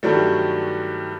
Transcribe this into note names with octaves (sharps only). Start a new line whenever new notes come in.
G2 D#3 F#3 G3 A3